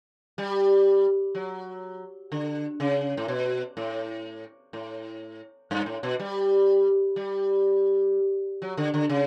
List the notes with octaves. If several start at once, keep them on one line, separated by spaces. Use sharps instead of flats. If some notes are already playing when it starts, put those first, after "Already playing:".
G3
F#3
D3
C#3
A2
B2
A2
A2
G2
A2
B2
G3
G3
F#3
D3
D3
C#3